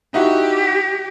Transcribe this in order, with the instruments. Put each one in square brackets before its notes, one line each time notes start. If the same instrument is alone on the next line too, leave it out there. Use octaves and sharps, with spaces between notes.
[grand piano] D#4 E4 F#4 [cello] G4